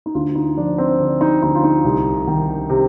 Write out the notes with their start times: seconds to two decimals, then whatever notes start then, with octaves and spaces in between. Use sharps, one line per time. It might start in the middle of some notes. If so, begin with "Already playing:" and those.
0.06 D#4
0.15 D2 F4
0.35 D#4
0.57 F3 D4
0.78 C4
0.99 D3 D4
1.21 D#4
1.42 D2 D#4
1.55 F4
1.64 D#4
1.85 C2
2.27 D#3
2.70 C3